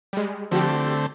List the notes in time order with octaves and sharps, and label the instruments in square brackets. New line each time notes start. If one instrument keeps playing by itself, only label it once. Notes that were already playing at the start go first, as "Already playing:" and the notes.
[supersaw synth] G3 G#3
[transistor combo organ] D3 A3 C4 [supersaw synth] F3 F#4 G4